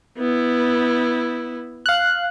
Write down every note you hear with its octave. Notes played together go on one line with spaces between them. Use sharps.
B3 E4
F5 F#6